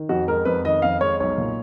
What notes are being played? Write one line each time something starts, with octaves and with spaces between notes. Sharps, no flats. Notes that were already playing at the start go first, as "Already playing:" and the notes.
Already playing: D#3
F2 F#4
G#3 A#4
F2 B4
D#3 D#5
F2 F5
G#3 C#5
B1 C#5
A#2